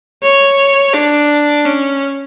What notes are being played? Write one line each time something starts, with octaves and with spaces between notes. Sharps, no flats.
C#5
D4
C#4